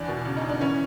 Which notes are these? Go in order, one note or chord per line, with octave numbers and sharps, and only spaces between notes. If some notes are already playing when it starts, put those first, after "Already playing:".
Already playing: E2 E3 D4
B2
C#3
D#4
C#3
D4
E3 C#4